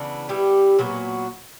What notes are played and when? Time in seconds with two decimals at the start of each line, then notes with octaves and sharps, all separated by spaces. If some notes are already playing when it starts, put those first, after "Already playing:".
Already playing: C#3 E3 B3 D4
0.29 G3 B3 E4 G4
0.79 A#2 F#3 B3 F#4